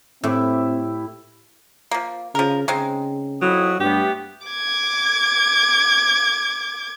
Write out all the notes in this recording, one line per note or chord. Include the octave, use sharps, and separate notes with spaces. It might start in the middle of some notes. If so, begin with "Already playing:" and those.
A2 C4 E4 G4 E5
F3 A#3
C#3 F3 A#4
C#3 G#3 C4 D#4
F2 F#3 E4 D#6
G2 F#3 A3 B3 G4
D6 G#6